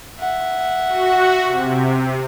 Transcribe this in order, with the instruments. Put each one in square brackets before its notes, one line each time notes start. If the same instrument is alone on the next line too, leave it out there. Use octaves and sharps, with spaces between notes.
[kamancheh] E5 F#5
[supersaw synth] F#4
C3